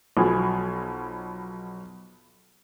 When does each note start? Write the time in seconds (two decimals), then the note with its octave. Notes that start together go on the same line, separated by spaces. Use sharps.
0.17 B1 B2 F3 G#5